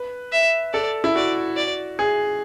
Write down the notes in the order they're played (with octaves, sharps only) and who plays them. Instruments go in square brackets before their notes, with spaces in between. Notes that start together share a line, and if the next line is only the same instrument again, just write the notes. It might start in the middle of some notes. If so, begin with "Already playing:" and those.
Already playing: [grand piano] B4
[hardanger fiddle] E5
[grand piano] A4 [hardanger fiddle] D5
[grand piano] E4
[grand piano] F#4 [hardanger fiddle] D5
[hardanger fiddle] D5
[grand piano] G#4